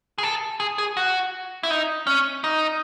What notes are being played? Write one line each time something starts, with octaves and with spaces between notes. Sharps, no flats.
G#4
A4
G#4
G#4
F#4
E4
D#4
C#4
D#4